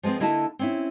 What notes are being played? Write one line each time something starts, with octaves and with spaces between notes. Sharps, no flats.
F3 G#3 B3 C4
D3 A#3 E4 D#5 E5 A5
C4 C#4 E4